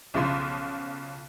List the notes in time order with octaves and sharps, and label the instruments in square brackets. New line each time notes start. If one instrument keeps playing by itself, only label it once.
[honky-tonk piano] B1 C#3 F3 C6